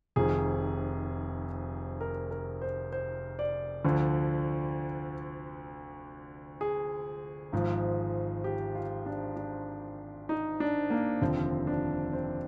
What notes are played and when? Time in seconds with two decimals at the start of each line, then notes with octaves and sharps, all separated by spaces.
0.16 F1 F2 D#3 G#4
2.01 A#4
2.31 A#4
2.62 C5
2.92 C5
3.39 D5
3.85 D2 D3 F3
6.61 G#4
7.52 G#1 G#2 F3
8.44 G4
8.75 F4
9.06 D4
9.36 D4
10.29 D#4
10.60 D4
10.90 A#3
11.21 F1 D#2 D3 F3 C4
11.67 D4
12.13 C4